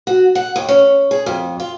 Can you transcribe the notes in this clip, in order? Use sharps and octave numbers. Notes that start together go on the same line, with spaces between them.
F#4
F#5
D#2
C#4
G#4
F2
F4